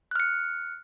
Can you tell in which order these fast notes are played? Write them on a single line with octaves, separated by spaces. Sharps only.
F#6 F6 C#7